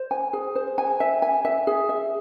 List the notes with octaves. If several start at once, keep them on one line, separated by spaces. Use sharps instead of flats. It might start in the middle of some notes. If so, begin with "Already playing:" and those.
Already playing: C5
G#5
G#4
C5
G#5
E5
G#5
E5
G#4
E5